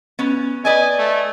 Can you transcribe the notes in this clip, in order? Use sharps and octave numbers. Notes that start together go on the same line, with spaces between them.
B3 C#4
B4 D5 D#5 G#5
A3